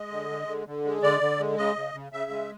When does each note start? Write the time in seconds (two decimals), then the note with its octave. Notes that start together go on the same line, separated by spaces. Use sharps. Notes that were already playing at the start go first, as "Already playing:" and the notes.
Already playing: G#3 D#5
0.11 D3
0.30 G#3
0.47 D3
0.67 D3
0.85 G#3
1.03 D3 D5
1.21 D3
1.39 G#3
1.58 C#3 D#5
1.76 C#3
1.94 C#3
2.12 C#3 E5
2.31 G#3